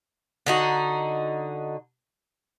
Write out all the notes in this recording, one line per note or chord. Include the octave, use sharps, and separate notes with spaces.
D3 D#4 F#4